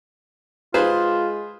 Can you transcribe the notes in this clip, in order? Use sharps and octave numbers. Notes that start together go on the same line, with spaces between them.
G#3 F4 G#4 B4 C5